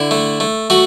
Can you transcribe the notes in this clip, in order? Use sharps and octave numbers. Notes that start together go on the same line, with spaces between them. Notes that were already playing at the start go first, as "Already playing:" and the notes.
Already playing: D3 E4
A3
A3
A3 F#4